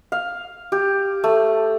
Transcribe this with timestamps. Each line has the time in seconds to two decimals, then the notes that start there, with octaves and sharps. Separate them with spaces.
0.12 F5
0.72 G4
1.24 A3